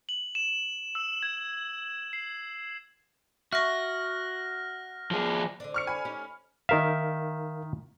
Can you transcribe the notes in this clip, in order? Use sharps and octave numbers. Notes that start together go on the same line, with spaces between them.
F#7
E7
E6
G#6
C7
F#4 E5 C#6 F6 A#6
F3 G#4
D3 C4 D4
C#6 F6 C#7
G#5 B5
C#4 D#4 G4
D#3 D#4 A#4 E5 F5